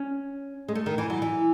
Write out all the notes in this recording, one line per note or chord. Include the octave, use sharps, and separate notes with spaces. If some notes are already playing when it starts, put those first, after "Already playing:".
Already playing: C#4
G#3
A3
D#3
E3
F#3
E3